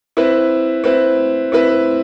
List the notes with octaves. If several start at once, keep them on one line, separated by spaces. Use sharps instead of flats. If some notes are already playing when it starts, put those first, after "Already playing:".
C4 E4 B4
C4 E4 B4
C4 E4 B4